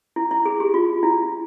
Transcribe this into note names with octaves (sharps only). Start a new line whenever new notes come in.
E4
E4
G#4
G4
F4
E4